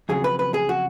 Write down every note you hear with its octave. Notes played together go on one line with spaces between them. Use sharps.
F2 C#3 F#3 G#4
B4
B4
G#4
F#4